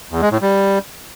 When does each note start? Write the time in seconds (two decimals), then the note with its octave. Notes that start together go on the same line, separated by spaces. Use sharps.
0.11 E2
0.21 G#3
0.31 A2
0.42 G3